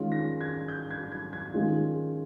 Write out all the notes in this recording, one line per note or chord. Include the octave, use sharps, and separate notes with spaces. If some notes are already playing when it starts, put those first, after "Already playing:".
Already playing: D#3 G#3 C#4 F4
A#6
G#6
G6
G#6
G#6
G#6
D#3 G#3 C#4 F4